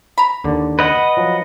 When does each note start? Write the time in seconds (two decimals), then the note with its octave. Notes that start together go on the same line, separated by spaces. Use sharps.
0.18 A#5 B5
0.44 D#2 D3 D5
0.79 B4 D#5 F#5
1.17 F3 F#3